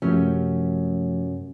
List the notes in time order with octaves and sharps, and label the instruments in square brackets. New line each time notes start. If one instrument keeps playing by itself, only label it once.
[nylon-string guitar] F#2 C#4 G4 [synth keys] C3 F3 A3